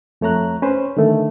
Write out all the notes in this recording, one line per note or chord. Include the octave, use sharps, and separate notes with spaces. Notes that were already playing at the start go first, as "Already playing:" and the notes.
F2 A3 C#5 A#5 F#6
C#4 B4 C5
D3 D#3 A3